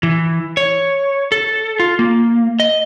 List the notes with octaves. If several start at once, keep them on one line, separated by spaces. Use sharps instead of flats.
E3
C#5
A4
F4
A#3
D#5